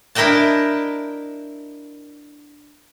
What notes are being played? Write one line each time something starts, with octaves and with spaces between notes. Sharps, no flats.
D4 E4 A#4 D#5 G5 A5